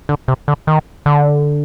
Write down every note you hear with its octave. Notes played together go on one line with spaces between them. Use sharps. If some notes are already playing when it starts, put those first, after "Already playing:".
D3
C3
D3
D#3
D3